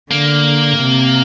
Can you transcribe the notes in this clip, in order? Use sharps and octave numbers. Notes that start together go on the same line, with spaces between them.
D3 A#3
C3